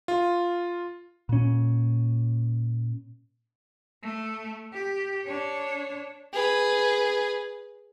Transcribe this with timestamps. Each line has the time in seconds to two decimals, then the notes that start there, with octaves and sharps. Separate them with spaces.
0.08 F4
1.29 A#2 C#4
4.03 A3
4.73 G4
5.24 D4 C#5
6.33 G#4 B4